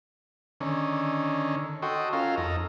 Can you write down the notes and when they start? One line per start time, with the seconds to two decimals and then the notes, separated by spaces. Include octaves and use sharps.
0.61 D3 D#3 C#4
1.82 F#4 A4 D#5 G5 C6 C#6
2.13 C#4 F4 A4 A#4 F5
2.38 F2 D#4 A4 A#5